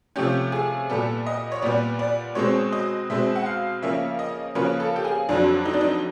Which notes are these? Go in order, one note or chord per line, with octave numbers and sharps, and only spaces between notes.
C3 F3 A3 C#4 G4
G#4
A#2 G3 B3 A4
D#5
C#5
A#2 G3 B3 D5
D5
B2 G#3 C4 C#5
D#5
B2 G#3 C4 E5
F#5
F5
C#3 F3 A#3 C#4 E5
D#5
C#3 F3 A#3 C#4 B4
A4
G4
G#4
F2 D3 F#3 D4
D#4
D4
D#4